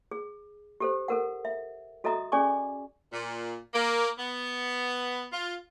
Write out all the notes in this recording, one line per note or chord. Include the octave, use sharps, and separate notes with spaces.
G#4
G4 A4 C5
A4 A#4 F#5
E5
F#4 A4 D#5 E5 A#5 D#6
C#4 G#4 D5 G#5 C#6 D6
A#2
A#3
B3
F4